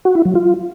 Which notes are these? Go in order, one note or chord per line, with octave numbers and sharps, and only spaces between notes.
F#4
E4
F#3
F4